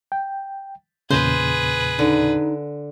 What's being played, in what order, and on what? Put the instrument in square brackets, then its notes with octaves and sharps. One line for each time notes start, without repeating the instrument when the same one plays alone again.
[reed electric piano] G5
[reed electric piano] E2 A#2 C#3 [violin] G#4 B4 [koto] C5
[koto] D3 [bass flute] D#4